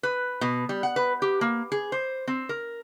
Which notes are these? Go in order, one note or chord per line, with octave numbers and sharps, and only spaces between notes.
B4
B2
G3
F#5
B4
G4
A#3
G#4
C5
C4
A#4